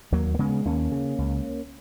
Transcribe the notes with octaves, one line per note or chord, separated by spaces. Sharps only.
D#2 F#3 A#3
A#3
C#3 G#3 B3
D#2 A#3 C#4
C#3
C#2